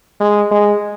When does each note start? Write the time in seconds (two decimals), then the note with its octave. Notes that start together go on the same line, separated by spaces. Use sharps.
0.20 G#3
0.51 G#3